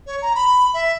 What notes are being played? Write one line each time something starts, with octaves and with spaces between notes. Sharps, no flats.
C#5
A#5
B5
E5